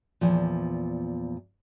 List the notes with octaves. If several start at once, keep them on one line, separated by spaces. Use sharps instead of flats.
E2 A#2 F3